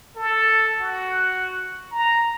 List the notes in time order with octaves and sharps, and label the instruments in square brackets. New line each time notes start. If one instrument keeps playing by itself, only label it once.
[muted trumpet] A4
F#4
A#5